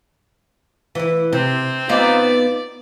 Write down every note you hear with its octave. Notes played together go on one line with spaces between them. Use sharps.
E3 E4
C3 C4
B3 D#4 F4 D5